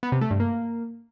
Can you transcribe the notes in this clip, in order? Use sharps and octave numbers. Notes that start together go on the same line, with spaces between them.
B3
C3
A3
G2
A#3